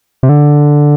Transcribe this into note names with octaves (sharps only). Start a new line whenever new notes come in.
C3
D3